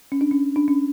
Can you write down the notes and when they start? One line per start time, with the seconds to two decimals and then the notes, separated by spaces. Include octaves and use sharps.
0.12 C#4
0.21 D4
0.31 C#4
0.56 D4
0.68 C#4